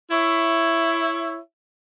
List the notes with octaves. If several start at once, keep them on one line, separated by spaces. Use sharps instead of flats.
E4 C#5 E5